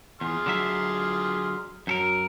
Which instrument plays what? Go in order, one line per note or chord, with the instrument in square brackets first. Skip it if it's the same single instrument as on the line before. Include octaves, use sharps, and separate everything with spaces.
[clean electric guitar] E2 [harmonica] G#4 C6 F6
[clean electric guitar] D3 F#3 E5
[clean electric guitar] F#2 A4 A#4 [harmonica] F#3